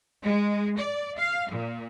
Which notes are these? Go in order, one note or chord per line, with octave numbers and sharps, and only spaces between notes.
G#3
D5
F5
A#2